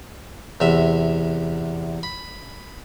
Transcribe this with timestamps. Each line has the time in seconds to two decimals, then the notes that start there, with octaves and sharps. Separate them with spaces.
0.60 E2 C3 E5
2.03 B5